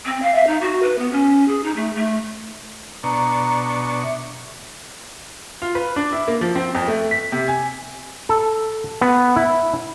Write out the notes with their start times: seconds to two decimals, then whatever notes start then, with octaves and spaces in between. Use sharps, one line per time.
0.06 C4
0.23 F5
0.35 E5
0.47 D#4
0.61 F#4
0.83 B4
0.99 B3
1.11 C#4
1.48 G#4
1.64 D#4
1.76 A3
1.95 A3
3.04 B2 D4 A#5 C#6
4.03 E5
5.62 F4
5.75 B4
5.96 D4
6.12 E4
6.28 A#3
6.41 F3
6.55 C4
6.75 F2
6.87 A3
7.11 B6
7.32 C3
7.48 G#5
8.29 A4
9.01 B3
9.36 E4